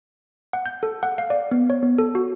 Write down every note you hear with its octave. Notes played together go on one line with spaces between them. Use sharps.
F#5
G6
A4
F#5
F5
D5
B3
C#5
B3
A4
F#4